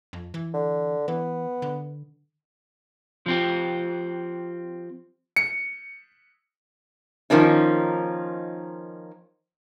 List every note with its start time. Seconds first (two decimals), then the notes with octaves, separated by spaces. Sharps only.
0.13 F2
0.34 E3
0.54 D3
1.08 E3 B3
1.62 D3
3.26 F3 C4 G4
5.36 C#7
7.30 D#3 F3 A#3 C#4 D#4